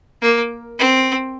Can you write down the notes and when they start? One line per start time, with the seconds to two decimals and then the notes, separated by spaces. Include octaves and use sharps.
0.22 A#3
0.79 C4